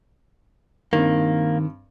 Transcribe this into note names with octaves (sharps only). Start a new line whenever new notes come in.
G2 D#3 A#3 C4